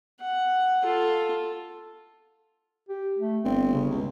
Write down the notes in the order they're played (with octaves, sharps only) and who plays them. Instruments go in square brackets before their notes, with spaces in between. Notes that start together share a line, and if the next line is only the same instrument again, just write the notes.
[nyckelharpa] F#5
F4 A4
[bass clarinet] G4
A3
[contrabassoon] G1 [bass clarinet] C4
[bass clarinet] C#3
[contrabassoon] C#2